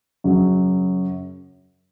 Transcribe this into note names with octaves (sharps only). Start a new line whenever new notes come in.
F#2 C#3 F#3